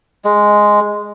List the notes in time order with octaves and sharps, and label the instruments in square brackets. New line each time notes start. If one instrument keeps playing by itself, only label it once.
[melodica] G#3